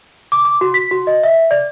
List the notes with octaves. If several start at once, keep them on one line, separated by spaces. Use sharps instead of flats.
D6
D6
F#4
B6
F#4
D#5
E5
D5